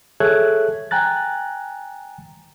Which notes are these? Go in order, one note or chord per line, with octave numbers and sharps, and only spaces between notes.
G#4 A4 C#5 E5 F#6 G#6
G5 G#5 A#5 F#6 A6